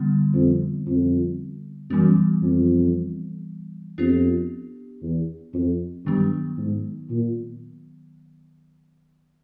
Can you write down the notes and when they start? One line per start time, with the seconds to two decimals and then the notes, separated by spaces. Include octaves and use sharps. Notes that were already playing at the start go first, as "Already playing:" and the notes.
Already playing: D3 G3 B3
0.34 F2
0.87 F2
1.90 F#2 E3 G3 B3
2.42 F2
3.98 F2 B3 D4 G4
5.02 E2
5.54 F2
6.05 G2 D#3 F#3 B3
6.58 G#2
7.10 A#2